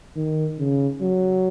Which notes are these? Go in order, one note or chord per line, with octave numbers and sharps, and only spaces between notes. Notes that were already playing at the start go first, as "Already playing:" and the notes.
D#3
C#3
F#3